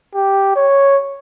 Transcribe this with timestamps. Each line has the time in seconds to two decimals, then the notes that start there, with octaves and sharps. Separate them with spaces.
0.15 G4
0.56 C#5